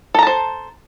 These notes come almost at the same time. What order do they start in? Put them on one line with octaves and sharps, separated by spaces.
A4 A#5 A5 C5